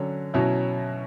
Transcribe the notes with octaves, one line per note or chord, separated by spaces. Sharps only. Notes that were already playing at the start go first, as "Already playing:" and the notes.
Already playing: D3 F#3 C#4
B2 F#3 C#4 E4